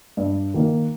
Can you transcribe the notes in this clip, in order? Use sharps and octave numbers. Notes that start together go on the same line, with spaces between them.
G2
D#3 A#3